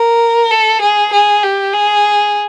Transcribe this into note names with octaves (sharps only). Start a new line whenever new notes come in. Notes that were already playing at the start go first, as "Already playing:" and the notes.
Already playing: A#4
A4
G#4
G#4
G4
G#4